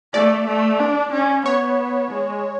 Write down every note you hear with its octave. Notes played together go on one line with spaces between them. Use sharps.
A3 D5
A3
D4
C#4
B3 C#5
G#3